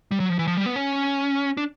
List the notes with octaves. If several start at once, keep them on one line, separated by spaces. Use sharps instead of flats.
G3
F#3
F3
E3
F3
G3
B3
C#4
D4